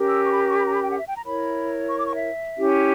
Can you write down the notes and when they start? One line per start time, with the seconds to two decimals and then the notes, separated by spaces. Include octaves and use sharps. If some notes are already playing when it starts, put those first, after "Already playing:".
Already playing: C#4 G4 A#4
0.09 E6
0.25 C#6
0.33 B5
0.45 D6
0.49 C#6
0.59 B5
0.67 A#5
0.75 B5
0.82 G5
0.91 F#5
0.99 E5
1.07 G5
1.16 A#5
1.24 E4 A#4 C#5 B5
1.89 C#6
1.98 D6
2.06 C#6
2.14 E5
2.56 C#4 E4 G4